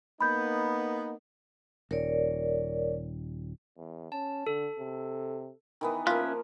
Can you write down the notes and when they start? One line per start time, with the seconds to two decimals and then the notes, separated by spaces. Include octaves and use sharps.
0.21 A#3 B3 D#4 B5 G6
1.91 D#1 A#4 C#5 D5
3.77 E2
4.12 C#4 A5
4.47 D3 A4
4.79 C3
5.81 D#3 E3 B3
6.07 F3 A#3 C#4 F4 E5 F#6